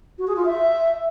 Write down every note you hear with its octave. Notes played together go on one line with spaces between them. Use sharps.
F#4
G#4
F4
E5